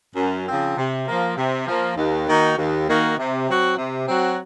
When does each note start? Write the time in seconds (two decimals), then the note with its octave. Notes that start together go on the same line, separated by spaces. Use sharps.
0.15 F#2
0.46 C#3 F3 C4
0.76 C3
1.07 F3 A#3
1.37 C3
1.67 F3 A#3
1.96 D#2
2.27 D#3 A#3 D#4 F#4
2.57 D#2
2.87 D#3 A#3 D#4 F#4
3.17 C3
3.48 F#3 C4 F#4
3.77 C3
4.07 F#3 C4 F#4